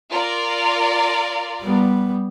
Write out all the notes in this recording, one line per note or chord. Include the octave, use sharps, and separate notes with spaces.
F4 A#4 D5
G3 B3